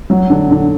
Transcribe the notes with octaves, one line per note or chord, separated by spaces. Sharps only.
F#3
D3
D3